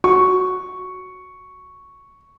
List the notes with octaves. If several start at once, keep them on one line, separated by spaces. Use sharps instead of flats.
F#4 C#6